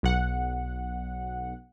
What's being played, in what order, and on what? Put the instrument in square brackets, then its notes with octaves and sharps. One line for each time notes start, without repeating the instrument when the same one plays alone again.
[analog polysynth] B1 F#5